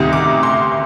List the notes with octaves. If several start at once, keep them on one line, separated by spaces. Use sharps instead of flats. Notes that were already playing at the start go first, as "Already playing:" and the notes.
Already playing: D2 C3 D#3 G3 D#6
D6
C6